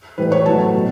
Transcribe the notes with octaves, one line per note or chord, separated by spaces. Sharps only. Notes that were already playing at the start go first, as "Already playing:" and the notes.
A2 E3 G3 B4
C#5
A2 F#3 A3 A5
B2 F#3